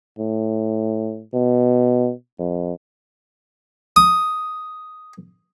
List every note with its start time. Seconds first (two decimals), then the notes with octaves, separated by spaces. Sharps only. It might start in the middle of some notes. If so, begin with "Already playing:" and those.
0.19 A2
1.34 B2
2.39 F2
3.96 D#6